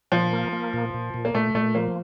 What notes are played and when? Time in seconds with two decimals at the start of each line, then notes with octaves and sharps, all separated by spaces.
0.12 A#2 F3
0.33 A#3
0.53 A#3
0.74 A#2
0.94 A#2
1.14 A#2
1.25 A#3
1.35 A#2 A3
1.55 A#2 A3
1.75 F3 A#3